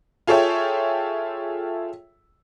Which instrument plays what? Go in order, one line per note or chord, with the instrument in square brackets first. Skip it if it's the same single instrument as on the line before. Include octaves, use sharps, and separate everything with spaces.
[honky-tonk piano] F4 G#4 A4 C#5 E5 G5